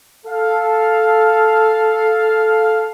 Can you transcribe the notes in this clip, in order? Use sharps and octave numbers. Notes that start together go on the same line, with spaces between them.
A4 F5